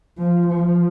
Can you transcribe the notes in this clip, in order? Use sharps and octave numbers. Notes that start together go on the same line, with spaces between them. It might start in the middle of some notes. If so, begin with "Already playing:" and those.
F3
F3